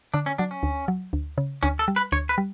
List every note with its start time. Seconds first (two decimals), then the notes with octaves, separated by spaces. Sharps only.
0.14 D3 D4
0.26 C#4
0.38 F#3 D4
0.51 C#4
0.63 D2
0.88 F#3
1.13 D2
1.38 C#3
1.63 D2 C#4
1.79 A4
1.88 G3
1.96 B4
2.12 D2 C#5
2.29 B4
2.38 G3